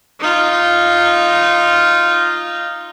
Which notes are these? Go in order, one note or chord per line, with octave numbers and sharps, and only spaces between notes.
D#4 F4